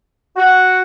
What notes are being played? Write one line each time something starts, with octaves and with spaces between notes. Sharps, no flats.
F#4